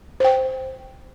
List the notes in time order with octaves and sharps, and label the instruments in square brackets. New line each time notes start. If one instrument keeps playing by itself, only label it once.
[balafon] C5 G5